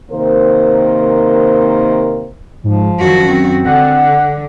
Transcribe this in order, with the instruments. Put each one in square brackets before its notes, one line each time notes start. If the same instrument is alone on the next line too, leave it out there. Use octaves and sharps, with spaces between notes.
[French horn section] C3 D#3 A#3 A#4 C5
[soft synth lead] G#2 [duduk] F3
[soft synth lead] F#2 [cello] D#3 F#4
[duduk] C4
[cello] D3 [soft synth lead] F#5